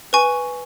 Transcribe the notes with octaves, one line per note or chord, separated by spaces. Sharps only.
B4 G#5 C#6